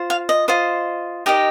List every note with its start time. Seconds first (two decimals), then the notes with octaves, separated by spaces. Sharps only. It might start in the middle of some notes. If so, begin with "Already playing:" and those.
Already playing: F4 C5
0.10 F5
0.29 D#5
0.48 F4 C5 D#5
1.26 D#4 G4 A#4 D#5